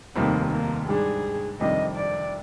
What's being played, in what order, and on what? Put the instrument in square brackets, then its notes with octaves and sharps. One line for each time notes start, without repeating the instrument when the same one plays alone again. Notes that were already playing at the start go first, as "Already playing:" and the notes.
[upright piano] F1 D#2 D#3 G3 C4 [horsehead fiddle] A#3
[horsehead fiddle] A#3
[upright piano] G#2 G3 D4 [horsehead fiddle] G#4
[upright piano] F2 C3 D#3 G3 D4 [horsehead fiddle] D#5
[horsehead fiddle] D5